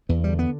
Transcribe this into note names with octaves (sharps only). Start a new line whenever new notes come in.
E2 B3
D3 G3
B3